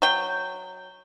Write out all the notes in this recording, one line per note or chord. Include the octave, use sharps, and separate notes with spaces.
F#3 G5